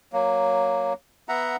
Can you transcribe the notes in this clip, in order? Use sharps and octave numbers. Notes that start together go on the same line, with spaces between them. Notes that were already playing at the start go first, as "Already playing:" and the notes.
F#3 A#3
B3 E5 F#5 A#5